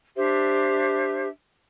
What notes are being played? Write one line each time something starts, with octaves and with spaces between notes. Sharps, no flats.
D4 G4 C5 E5